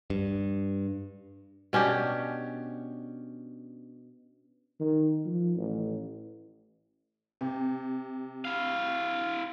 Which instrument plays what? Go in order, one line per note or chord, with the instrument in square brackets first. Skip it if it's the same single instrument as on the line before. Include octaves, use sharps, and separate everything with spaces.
[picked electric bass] G2
[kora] B2 C#4 D4 G4
[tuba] D#3
F3
A1
[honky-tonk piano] C3
[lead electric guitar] E4 F5